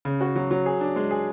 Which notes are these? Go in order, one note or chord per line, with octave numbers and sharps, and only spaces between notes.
C#3
F#4
F#3
F#3
G#4
D4
G#3
G#4